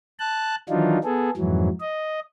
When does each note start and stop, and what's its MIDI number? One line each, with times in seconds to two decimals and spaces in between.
0.19 0.55 81
0.19 0.55 90
0.69 0.98 51
0.69 0.98 52
0.69 0.98 54
0.69 0.98 62
0.69 0.98 63
0.69 0.98 65
1.04 1.30 59
1.04 1.30 68
1.04 1.30 69
1.37 1.69 41
1.37 1.69 44
1.37 1.69 52
1.37 1.69 54
1.80 2.20 75